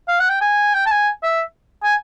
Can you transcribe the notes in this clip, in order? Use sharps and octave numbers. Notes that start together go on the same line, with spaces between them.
F5
F#5
G5
G#5
G5
A5
G#5
E5
G#5